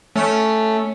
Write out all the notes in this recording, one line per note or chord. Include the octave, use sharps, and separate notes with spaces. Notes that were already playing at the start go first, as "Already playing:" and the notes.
A3 C#4